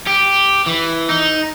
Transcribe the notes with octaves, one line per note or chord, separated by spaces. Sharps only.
G4
E3
D#4